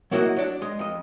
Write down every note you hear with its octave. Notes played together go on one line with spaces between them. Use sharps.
F#3 A#3 E4 F#4 D#5 F#5
F#3 D4
G#3 D#5
F2 D#5